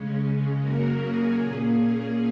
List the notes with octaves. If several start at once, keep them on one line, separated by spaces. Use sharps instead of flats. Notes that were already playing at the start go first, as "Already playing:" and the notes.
Already playing: C#3 G#3 C#4
F#2 C#3 A#3 C#4 F#4 A#4
G#4
A#2 A#3 C#4 G#4